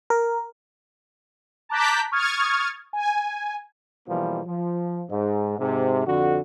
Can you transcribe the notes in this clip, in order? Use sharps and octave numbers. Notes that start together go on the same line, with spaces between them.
A#4
A5 A#5 D6 F#6 G6 B6
C#6 D#6 F6 G#6 A6
G#5
B1 B2 E3 F3 G3 A#3
F3
G#2
G#2 C3
F2 D3 F#4